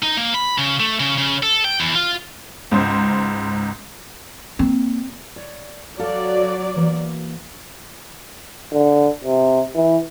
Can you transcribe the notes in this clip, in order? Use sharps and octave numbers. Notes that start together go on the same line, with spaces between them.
D#4
A#3
B5
C#3
A3
C#3
C#3
A4
G5
E2
F4
C#2 G#2 C5
A#3 C4
C#5 D5
F#3 A4 D5 F5
E3 A#3
D3
C3
E3